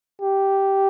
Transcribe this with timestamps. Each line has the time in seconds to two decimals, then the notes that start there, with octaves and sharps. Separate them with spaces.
0.22 G4